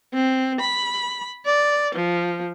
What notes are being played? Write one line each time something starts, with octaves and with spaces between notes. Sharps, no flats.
C4
B5
D5
F3